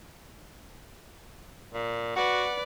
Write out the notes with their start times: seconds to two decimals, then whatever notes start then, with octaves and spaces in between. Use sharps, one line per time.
1.74 A#2
2.16 F#4 B4 D5 F#5